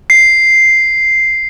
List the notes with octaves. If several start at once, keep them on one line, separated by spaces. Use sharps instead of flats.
C7